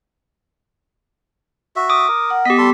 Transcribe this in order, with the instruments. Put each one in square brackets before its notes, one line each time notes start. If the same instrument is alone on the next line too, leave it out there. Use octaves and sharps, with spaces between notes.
[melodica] F#4 E5
[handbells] D6 D#6
[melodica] A#4
[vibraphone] F#5
[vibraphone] B3 [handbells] G4 B6 [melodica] D#5
[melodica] G3 A4 C6